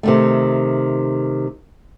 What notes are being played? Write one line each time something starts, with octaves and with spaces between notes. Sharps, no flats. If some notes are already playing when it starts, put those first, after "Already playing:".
C3 D#3 A3